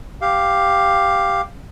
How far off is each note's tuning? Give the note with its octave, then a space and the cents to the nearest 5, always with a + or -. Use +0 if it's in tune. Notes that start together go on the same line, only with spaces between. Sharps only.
G4 +0 F5 +0